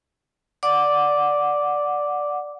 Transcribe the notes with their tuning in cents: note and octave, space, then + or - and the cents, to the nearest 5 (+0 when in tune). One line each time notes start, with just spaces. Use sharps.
D5 +0 F#5 -15 D6 +0